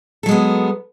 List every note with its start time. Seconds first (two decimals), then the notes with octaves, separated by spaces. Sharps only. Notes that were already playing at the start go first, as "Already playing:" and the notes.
0.23 A4
0.26 F#3
0.29 G#3
0.31 B3